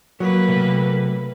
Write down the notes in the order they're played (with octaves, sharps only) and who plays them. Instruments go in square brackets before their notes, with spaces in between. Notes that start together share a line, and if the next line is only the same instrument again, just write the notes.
[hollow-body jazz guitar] F#3 [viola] A#3 B4
[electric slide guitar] C3 A3 A4